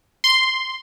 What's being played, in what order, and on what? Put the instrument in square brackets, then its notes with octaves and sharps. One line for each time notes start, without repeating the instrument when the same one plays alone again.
[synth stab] C6